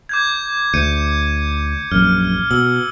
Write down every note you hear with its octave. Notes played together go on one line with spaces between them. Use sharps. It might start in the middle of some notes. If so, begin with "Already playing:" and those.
D6 G6 G#6
D2 G6 C#7 D#7
A#1 F#2 F6
B2 E6 G7